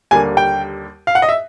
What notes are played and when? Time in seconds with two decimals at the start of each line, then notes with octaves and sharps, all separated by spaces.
0.11 D#2 D3 G3 A#3 G#5
0.37 G5
1.07 F5
1.15 F#5
1.22 D#5
1.29 E5